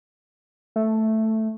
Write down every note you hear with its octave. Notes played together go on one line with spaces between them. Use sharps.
A3